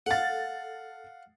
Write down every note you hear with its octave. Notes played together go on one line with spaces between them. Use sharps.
A4 F5 F#5 A6